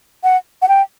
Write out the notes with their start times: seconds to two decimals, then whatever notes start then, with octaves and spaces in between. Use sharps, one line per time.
0.24 F#5
0.62 F#5
0.68 G5